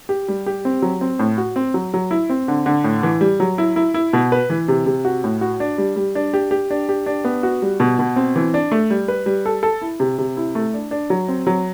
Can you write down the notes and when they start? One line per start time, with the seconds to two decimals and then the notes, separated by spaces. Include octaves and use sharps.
0.09 G4
0.28 G3
0.46 G4
0.65 C4
0.82 F#3
1.01 C4
1.19 A2
1.38 F#4
1.56 C4
1.74 F#3
1.94 F#3
2.11 E4
2.29 C4
2.48 D3
2.66 D3
2.84 A2
3.03 E3
3.21 G3
3.40 F#3
3.58 E4
3.76 E4
3.94 E4
4.13 B2
4.32 B4
4.50 E3
4.68 C3
4.86 C3
5.05 F#4
5.24 A2
5.41 F#4
5.60 D4
5.78 G3
5.96 G3
6.15 D4
6.34 G4
6.51 G4
6.70 D4
6.89 G4
7.06 D4
7.25 B3
7.43 F#4
7.62 G3
7.80 B2
7.99 B2
8.16 C4
8.36 E3
8.54 D4
8.72 A3
8.90 G3
9.08 B4
9.26 G3
9.46 A4
9.63 A4
9.82 E4
10.00 C3
10.18 C3
10.37 E4
10.55 A3
10.74 D4
10.91 D4
11.10 F#3
11.28 C4
11.47 F#3